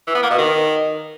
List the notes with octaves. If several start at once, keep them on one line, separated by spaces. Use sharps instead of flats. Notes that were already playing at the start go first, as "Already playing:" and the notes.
E3
B3
A#3
B2
D#3